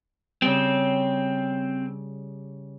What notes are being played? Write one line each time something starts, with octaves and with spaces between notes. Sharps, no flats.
C#3 G3 C4